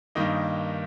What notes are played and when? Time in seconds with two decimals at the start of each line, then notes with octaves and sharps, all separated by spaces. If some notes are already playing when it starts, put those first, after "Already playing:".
0.15 G2 D#3 A#3 D#4